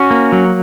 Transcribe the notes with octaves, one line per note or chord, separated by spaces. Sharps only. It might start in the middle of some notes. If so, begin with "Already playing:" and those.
Already playing: C#4 F#4
A#3
F#3